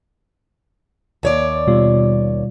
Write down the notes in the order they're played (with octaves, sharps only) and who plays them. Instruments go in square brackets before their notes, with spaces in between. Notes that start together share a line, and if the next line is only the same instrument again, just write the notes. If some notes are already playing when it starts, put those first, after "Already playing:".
[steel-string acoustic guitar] D#2 C#5 D5
[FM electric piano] B2 G3 F4